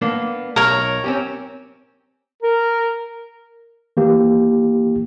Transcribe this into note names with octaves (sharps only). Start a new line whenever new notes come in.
A#3 B3 D4
B1 A#4 C#5
C4 C#4 G4
A#4
E3 A#3 G4